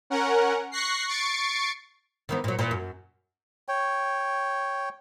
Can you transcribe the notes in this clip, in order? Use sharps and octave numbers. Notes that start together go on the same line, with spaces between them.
C#4 A#4 F#5
C#6 F#6 A#6 C7
C#6 A6 C7 D7
D#3 E3 B3
A#2 F#3
A#2 E3
F#2
C#5 G5